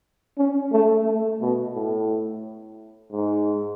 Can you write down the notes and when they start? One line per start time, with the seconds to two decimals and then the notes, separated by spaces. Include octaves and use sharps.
0.38 C#4
0.73 A3
1.06 A3
1.41 B2
1.75 A2
3.12 G#2